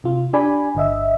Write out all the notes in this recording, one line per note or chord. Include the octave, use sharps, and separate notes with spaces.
C3 F4
D4 G4 D5 G#5 B5
G1 D3 D#5 E5